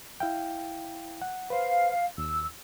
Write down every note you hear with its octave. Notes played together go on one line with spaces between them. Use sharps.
E4 F5 G5
F#5
B4 C5 F5
D#2 E6